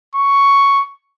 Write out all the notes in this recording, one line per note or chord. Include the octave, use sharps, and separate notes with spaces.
C#6